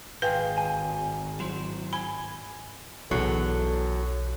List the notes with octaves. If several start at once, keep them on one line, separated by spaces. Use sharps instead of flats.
G#1 D#3 F4 G#4 B4 G5
G#5
F#3 E4 F#4 C5
G#5 B5
B1 E2 F#3 A4